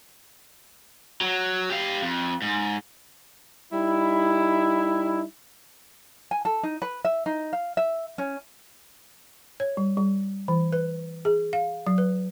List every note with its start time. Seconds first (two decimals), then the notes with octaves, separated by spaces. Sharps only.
1.21 F#3
1.70 G4 F5
2.02 F2
2.42 G#2
3.73 G3 D#4 E4
6.31 G#5
6.45 A4
6.63 D#4
6.82 B4
7.05 E5
7.26 D#4
7.53 F5
7.77 E5
8.18 C#4
9.60 C#5
9.77 G3
9.97 G3
10.48 E3
10.73 B4
11.25 G#4
11.53 F5
11.87 F#3
11.98 B4